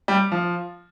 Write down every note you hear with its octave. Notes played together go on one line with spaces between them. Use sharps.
G3
F3